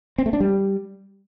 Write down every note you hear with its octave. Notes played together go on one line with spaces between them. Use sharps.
C4
A3
D4
G3